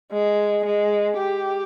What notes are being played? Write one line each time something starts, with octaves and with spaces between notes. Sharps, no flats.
G#3
G#3
G4